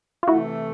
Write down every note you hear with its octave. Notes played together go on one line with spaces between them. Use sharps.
F4
C3 E3 A3 E4 F#4